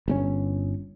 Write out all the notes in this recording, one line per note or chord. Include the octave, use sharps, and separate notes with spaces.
G1 C3 C#4